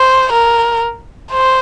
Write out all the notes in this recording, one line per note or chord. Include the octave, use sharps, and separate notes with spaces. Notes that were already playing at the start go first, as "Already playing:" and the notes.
Already playing: C5
A#4
C5